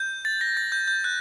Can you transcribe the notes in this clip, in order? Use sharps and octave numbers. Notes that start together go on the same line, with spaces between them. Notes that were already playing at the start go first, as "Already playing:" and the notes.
Already playing: G6
A6
A#6
A6
G6
G6
F#6